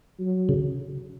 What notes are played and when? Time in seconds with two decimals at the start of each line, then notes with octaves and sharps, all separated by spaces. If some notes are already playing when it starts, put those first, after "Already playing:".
0.20 F#3
0.49 C#3